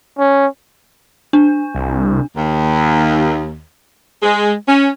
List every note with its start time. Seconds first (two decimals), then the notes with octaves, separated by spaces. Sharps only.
0.18 C#4
1.33 D4
1.75 C2
2.36 D#2
4.23 G#3
4.68 C#4